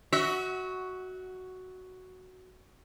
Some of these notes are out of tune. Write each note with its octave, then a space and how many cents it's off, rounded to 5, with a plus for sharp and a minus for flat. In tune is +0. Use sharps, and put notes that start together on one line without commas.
F#4 +5 E5 -35